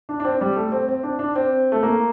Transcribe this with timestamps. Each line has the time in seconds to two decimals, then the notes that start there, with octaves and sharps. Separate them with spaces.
0.09 D4
0.20 D4
0.25 C4
0.41 G3
0.56 A3
0.72 C4
0.88 C4
1.03 D4
1.19 D4
1.36 C4
1.72 A3
1.83 A#3